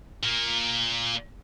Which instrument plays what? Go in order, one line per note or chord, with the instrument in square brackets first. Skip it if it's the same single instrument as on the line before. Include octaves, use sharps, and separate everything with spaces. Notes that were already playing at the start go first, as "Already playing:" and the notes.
[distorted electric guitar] A#2 A#3